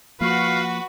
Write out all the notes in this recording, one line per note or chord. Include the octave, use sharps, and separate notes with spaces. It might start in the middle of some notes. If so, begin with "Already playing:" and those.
F3 A#3 F#4 B4 F5